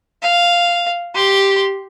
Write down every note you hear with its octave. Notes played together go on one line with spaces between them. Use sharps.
F5
G4 C6